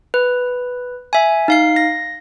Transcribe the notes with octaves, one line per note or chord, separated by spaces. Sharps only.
B4
E5 G#5
D#4 F5 C7
A#6